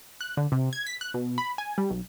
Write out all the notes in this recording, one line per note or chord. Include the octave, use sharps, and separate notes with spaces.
F#6
D3
C3
G#6
B6
F#6
B2
B5
G#5
G3
B1